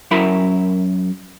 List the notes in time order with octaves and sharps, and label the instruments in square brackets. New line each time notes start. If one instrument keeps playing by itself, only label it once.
[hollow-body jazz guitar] F#2 E4 A#4 B5